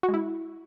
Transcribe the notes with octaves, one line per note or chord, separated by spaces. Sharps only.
F#4
G#3
E4